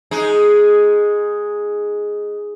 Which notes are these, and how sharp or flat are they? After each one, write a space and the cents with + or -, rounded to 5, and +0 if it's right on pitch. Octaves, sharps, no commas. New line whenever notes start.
G#3 +0 D#4 +0